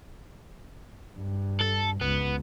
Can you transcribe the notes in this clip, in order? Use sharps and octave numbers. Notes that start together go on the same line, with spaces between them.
G2
A4
C#2 B3